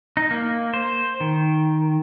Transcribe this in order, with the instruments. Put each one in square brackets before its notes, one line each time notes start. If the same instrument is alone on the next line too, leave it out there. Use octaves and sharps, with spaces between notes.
[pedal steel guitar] D#4
A#3
C5
D#3